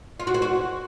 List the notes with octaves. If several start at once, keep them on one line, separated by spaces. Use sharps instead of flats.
F4
F#4
C4
F#4